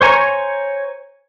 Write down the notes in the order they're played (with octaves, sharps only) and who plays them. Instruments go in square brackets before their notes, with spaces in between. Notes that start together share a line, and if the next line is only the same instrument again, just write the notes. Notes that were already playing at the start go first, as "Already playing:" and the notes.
[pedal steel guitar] C5 C#5 G#5 A#5 C#6